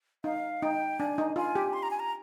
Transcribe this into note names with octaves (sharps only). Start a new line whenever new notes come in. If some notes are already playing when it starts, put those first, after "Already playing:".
D#4 F5
D#4 G5
D4 G#5
D#4
F4 G#5
G4
C6
A#5
G#5
A#5